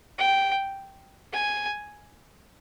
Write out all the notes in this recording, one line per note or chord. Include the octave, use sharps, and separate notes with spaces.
G5
G#5